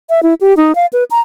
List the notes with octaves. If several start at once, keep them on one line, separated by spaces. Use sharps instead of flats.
E5
E4
G4
D#4
F5
B4
A#5